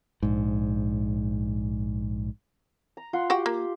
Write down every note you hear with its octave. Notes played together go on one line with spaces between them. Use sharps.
A#1 G#2
A#5
F4 F#5 C6
F#4 G4 F#5 G5
A#3